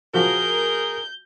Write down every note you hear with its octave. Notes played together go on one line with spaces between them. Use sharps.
F3 F#4 G#4 A#4 G6